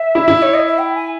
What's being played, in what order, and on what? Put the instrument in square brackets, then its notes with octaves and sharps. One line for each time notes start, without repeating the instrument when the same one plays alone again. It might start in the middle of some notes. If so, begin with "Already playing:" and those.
Already playing: [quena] E5
[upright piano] E4
E4
[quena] C#5
D#5
E5
G5
G#5